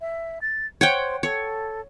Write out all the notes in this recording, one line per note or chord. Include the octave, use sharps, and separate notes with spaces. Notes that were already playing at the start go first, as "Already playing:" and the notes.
E5
A6
C5 C#5 F#5 G5
A4 C#5